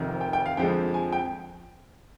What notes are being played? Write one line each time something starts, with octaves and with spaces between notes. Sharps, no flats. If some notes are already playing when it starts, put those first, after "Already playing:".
Already playing: F1 F2 D#3
G5
G5
F5
F2 D3 F3 G#3 G5
G#5
G5